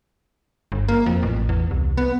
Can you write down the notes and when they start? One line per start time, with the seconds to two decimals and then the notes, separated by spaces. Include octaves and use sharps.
0.72 G1
0.88 A#3
1.06 F2
1.23 A1
1.49 E2
1.71 C2
1.97 B3